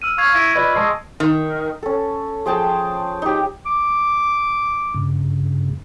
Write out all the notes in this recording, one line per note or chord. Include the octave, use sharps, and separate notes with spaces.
E6 F6 D#7
F5 C#6 G#6
E4 A#6 D7
F4 B4 D5 D#5
G#3 D#5 A5 E6 C7
D#3
C#4 A4
F3 G#4 G5 A5
D#4 G4
D6
G2 C#3